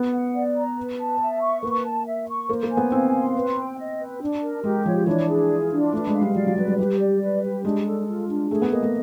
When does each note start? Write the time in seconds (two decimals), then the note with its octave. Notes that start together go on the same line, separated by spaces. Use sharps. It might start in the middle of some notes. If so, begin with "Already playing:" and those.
Already playing: B3
0.12 F#5
0.34 D5
0.56 A#5
0.77 B4
0.99 A5
1.20 E5
1.42 C#6
1.63 A#3 B4
1.84 A5
2.06 E5
2.27 C#6
2.49 A#3 C5
2.63 A#3
2.71 G#5
2.77 B3
2.92 C4 F5
3.14 C6
3.35 B4
3.56 G5
3.78 D#5
4.00 B4
4.21 D4
4.43 A#4
4.64 G#3 G4
4.85 F3 C#5
5.07 E3 D4
5.28 G#4
5.50 F4
5.72 D4
5.92 A3 B4
6.07 G#3
6.15 F5
6.21 G3
6.36 F#3 D5
6.47 F#3
6.57 G3 B4
6.68 G3
6.79 G3 G4
7.00 D5
7.21 B4
7.43 G4
7.64 G#3 D4
7.86 A4
8.08 F4
8.29 D4
8.51 A3 G#4
8.62 B3
8.71 A#3 D#5
8.83 A3